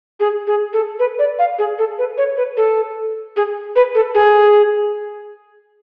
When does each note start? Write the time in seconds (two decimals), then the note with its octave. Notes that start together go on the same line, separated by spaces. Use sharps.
0.20 G#4
0.47 G#4
0.73 A4
0.99 B4
1.19 D5
1.39 F5
1.59 G#4
1.79 A4
1.99 B4
2.18 C#5
2.37 B4
2.57 A4
3.37 G#4
3.76 B4
3.95 A4
4.15 G#4